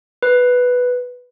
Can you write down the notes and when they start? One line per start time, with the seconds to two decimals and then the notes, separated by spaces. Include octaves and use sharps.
0.23 B4